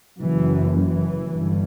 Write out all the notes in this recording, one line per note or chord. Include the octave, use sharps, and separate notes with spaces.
F#1 F#2 E3
E3
G1 G2